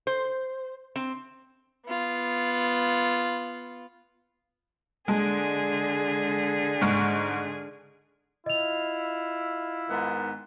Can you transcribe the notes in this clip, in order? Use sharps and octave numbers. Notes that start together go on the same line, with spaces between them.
C5
C4
B3 F4
D3 G#3 G#4
G#2 C#6 F6
E4 F4 D#5 F7
G#2 D#3 B3